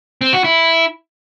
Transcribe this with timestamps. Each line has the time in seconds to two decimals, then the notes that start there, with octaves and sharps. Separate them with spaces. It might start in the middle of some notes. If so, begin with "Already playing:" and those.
0.21 C4
0.33 F#4
0.44 E4